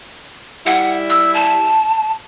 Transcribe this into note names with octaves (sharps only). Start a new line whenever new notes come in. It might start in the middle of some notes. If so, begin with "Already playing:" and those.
G3 E4 F#5
E6
A5